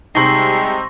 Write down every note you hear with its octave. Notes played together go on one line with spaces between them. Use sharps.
C3 G3 G#3 D#4 C6 C#6 A#6 C7